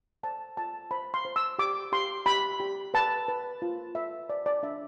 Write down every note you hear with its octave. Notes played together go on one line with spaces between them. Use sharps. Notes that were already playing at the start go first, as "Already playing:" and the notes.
C5 A5
F4 A5
C5 B5
C6
C5
E6
G4 D6
G4 C6
G4 B5
G4
B4 A5
B4
F4
B4 E5
C5 D5
D5
D4 E5